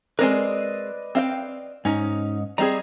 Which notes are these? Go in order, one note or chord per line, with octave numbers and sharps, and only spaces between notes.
G#3 C4 A#4 B4 D5 D#5
C4 F5 G5
G#2 C#4 D#4
G3 C4 G#4 D#5 A#5